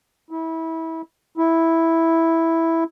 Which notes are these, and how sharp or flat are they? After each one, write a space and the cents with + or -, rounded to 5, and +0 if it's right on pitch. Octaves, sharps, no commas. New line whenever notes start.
E4 -25
E4 -5